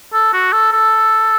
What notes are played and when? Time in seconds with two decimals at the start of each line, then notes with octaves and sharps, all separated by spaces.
0.13 A4
0.33 F#4
0.52 A4
0.72 A4